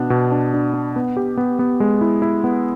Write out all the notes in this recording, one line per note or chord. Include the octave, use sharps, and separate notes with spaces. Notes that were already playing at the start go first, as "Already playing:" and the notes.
Already playing: B2 B3 D4
B2
D4
D4
D4
B3
G4
B3
B3
G#3
E4
E4
B3